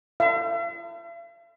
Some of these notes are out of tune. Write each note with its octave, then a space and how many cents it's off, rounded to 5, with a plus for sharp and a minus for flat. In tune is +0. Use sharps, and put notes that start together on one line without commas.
E5 +45